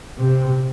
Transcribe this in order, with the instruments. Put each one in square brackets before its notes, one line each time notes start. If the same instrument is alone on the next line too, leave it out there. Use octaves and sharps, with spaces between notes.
[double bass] C3